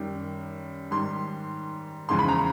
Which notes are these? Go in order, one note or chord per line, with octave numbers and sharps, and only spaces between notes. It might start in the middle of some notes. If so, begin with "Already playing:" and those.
Already playing: F#2 D#3 G3
G#2 D#3 G3 C6
E2 C#3 F3 G#3 C6
B5
A#5